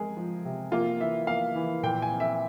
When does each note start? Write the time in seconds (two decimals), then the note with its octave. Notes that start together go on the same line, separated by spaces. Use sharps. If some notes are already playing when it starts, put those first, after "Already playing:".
Already playing: G#3 C4 G#4 A#4
0.17 F3
0.45 C3
0.72 A#3 F4
1.00 E3 E5
1.27 A#3 F5
1.55 E3
1.83 A#2 G5
2.02 G#5
2.11 C4
2.20 E5